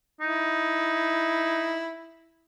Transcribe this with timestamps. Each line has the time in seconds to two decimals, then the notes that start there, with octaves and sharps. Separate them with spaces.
0.21 D#4 E4